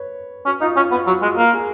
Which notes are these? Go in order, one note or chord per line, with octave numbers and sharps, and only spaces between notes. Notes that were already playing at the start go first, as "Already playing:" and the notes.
Already playing: B4 C#5
C#4 F#4
D#4 F4
C#4 F4
B3 F4
F#3 F#4
G#3 F4
A#3 F#4
G#4